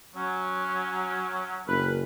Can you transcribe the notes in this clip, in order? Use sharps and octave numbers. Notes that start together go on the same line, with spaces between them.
F#3 C#4
F#1 A#4 B4